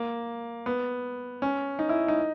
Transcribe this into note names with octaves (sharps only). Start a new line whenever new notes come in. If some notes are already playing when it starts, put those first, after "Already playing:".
Already playing: A#3
B3
C#4
D#4
E4
D#4